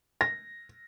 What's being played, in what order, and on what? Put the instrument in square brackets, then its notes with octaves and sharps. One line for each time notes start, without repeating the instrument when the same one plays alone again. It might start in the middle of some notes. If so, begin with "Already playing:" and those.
[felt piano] A#6